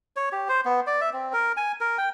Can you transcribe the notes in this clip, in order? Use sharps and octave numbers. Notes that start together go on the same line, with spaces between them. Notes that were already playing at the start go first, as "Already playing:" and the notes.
C#5
G4
C5
B3
D5
E5
C4
A#4
G#5
A#4
G5